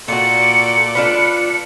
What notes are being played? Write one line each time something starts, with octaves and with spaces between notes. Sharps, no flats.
A#2 F4 F#4 A4 D5 C#7
D4 F4 B4